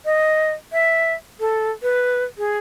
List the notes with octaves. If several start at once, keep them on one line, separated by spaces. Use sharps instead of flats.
D#5
E5
A4
B4
G#4